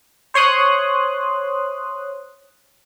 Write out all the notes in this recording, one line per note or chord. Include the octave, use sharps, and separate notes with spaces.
C5 C#5 C6 D#6 F#6